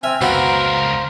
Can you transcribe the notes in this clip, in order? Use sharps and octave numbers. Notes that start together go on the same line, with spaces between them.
C4 E5 G#5 F6
C#2 B3 F#4 A#4 C5 F5